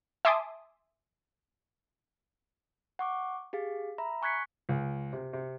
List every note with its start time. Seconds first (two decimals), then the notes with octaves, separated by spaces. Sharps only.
0.25 E5 G#5 A5 C6 D6 D#6
2.99 F#5 C#6 D6
3.53 G4 G#4 F5
3.98 E5 A#5 B5
4.22 G#5 C#6 F#6 G#6 B6 C#7
4.69 C#2
5.13 C3
5.33 C3